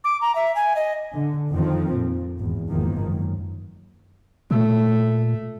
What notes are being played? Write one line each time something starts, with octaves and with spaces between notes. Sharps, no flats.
D6
A#5
E5
G#5
D#5
D3
F2 D#3 F3 C4
A#2
G#1 E2
F#1 E2 G#2 D#3 F3 A#3
F#2
A#2 A3